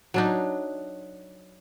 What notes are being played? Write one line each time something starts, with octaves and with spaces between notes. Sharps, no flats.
F#3 D4 D#4